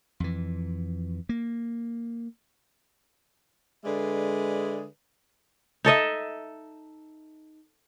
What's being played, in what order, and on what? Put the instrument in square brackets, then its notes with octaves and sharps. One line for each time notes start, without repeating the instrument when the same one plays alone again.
[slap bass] F2 E3
A#3
[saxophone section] D3 G#3 G#4 B4 D5 E5
[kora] D#4 A4 D#5 E5